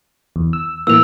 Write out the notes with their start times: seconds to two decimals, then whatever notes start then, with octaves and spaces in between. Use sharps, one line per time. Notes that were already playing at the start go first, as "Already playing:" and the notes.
0.36 E2
0.53 E6
0.87 A2 E3 A#3 E6 F7